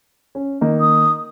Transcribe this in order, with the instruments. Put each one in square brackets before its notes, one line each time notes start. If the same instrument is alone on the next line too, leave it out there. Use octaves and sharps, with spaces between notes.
[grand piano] C#4
D#3 A#3 D#4
[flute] D#6